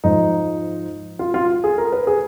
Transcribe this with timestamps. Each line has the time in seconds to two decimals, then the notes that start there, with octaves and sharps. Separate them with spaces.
0.04 G#2 F3 D#4
1.19 F4
1.34 F4
1.64 G#4
1.78 A#4
1.92 B4
2.07 G#4